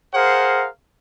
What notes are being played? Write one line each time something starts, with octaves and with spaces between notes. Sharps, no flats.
G#4 A#4 C5 F5 F#5